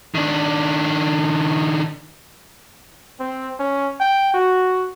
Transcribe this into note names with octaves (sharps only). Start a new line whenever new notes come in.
D#3 D4
C4
C#4
G5
F#4